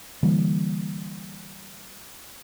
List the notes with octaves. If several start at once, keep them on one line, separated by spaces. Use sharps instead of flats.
D3 E3 G3 A#3